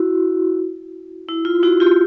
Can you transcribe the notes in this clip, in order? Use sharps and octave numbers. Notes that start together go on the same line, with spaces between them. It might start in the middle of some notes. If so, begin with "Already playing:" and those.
Already playing: E4 F#4
E4
F4
E4 F#4
F4 G4